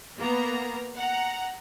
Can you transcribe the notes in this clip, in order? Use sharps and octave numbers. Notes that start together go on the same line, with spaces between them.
A#3 B3 A#5
F#5 A#5